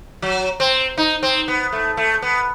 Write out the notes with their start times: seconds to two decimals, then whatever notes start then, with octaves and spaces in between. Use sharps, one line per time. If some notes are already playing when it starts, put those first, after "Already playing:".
0.22 F#3
0.60 C4
0.97 D#4
1.23 C4
1.48 B3
1.72 A3
1.97 A3
2.22 B3